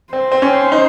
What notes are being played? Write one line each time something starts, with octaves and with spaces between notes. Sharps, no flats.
C4 C5
C4
C#4
D#4